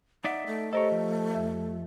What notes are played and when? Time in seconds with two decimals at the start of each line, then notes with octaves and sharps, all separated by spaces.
0.24 D#4 D5 E5 F#5
0.47 A3
0.73 G4 A4 A#4 C5 C#5 D#5
0.92 F3
1.34 F2 E5